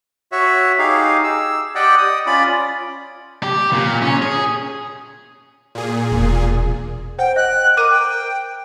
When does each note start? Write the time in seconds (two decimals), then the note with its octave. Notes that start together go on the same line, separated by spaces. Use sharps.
0.32 F#4 C#5 E5
0.79 D#4 G4 G#4 F5
1.24 E6
1.75 G4 D5 D#5 F#5 G5
1.98 D#6
2.27 C#4 F4 D5 B5
3.43 G4
3.72 A#2
4.02 C#4
4.22 G#4
5.75 A#2 G#4
6.12 E1
7.19 C5 F#5 G5
7.36 D#5 F#6
7.77 A#4 D6 F#6 D#7
7.90 G5